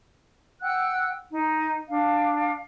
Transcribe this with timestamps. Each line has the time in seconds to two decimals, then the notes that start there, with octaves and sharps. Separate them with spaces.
0.62 F#5 G5 E6 F#6
1.31 D#4
1.89 D4 F5